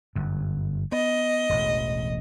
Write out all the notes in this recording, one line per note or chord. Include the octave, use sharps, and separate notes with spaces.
G1 F#2
B3 D#5
E1 A1